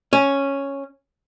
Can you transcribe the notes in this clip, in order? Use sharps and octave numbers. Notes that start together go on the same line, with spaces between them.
C#4